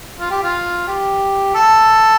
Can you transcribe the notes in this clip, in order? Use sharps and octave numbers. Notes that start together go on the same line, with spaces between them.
F4
G4
F4
G4
A4